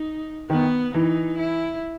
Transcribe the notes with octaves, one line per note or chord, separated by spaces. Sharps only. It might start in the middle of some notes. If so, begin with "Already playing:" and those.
Already playing: D#4
D#3 B3
E3 D#4
E4